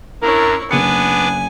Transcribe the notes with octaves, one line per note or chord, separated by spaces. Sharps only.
F#2 D4 E4 A#4 C#5
F#1 B3 D4 B4 G#5 D6 C#7